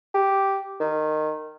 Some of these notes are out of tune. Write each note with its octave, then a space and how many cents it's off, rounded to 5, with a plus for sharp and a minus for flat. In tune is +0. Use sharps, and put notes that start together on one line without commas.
G4 -5
D#3 -15